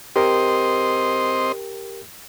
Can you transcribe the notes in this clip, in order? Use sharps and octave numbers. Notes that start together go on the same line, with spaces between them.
C4 G4 A#4 C5 D#5 G5